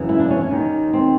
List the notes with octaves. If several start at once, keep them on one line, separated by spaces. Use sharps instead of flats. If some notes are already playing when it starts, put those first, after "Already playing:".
Already playing: F#2 C#3 E3
E4
D4
C#4
C#4
D#2 D#3
C4